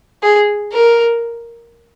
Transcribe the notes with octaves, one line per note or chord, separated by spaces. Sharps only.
G#4
A#4